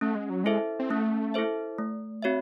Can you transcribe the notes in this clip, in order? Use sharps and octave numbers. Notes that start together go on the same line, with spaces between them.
A3 C#4
G#3
F#3
G#3 E4 A4 C5 E5
C4
A3 C#4
E4 A4 C5 E5
A3
C4 F#4 C#5 E5